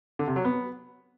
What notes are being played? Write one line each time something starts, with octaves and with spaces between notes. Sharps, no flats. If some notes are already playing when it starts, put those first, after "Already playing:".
D3
C3
F#3
B3